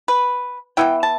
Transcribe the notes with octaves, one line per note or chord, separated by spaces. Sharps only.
B4
E3 B3 E4 G5
A5